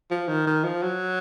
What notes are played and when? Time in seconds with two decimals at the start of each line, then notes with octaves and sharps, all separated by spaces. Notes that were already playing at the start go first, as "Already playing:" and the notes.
0.11 F3
0.28 D#3
0.47 D#3
0.64 F3
0.83 F#3